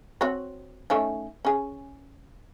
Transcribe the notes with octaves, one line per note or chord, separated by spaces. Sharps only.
C4 F#4 C#5
A3 C#4 D#4
C#4 G#4